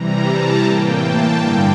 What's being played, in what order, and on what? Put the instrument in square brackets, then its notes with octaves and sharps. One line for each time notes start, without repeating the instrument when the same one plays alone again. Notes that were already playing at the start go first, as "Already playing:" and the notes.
Already playing: [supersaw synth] C3 E3 G3 A#5
A5
A2 E3 A#3 G5
A5
G2 D3 G3 A#3 G5